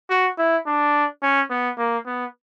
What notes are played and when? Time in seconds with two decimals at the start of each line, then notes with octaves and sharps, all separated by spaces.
0.10 F#4
0.38 E4
0.66 D4
1.22 C#4
1.50 B3
1.78 A#3
2.06 B3